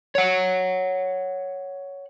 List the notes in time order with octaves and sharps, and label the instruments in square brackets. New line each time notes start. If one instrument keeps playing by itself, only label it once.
[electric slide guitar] C#5 F#5